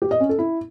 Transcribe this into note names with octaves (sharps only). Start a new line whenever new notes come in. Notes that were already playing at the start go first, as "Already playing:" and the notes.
G4
D#5
C#4
A4
E4